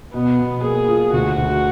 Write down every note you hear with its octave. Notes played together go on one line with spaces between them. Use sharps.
B2 B3
B2
A#3 G#4
F4
D2 F#4
D2